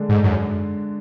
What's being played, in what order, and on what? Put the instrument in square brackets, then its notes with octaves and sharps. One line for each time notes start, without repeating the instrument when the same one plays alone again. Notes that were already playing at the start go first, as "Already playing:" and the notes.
Already playing: [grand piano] D3 G#3 D4
[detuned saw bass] G#2
F#2